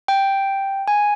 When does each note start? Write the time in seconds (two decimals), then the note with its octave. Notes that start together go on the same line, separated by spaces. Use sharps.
0.08 G5
0.88 G#5